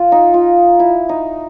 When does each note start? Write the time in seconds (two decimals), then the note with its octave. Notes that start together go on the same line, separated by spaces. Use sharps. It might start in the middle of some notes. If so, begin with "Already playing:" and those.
Already playing: F4
0.12 D#4
0.34 F4
0.80 E4
1.09 D#4